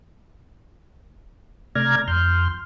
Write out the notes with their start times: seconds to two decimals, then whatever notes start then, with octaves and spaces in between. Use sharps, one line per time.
1.75 C3 A3 D5 A#5 F6 G#6
2.08 F2 C6 F6 G6